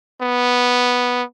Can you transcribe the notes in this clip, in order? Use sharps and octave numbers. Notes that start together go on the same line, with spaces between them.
B3